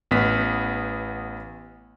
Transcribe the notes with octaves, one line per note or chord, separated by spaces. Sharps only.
A1 B3 B6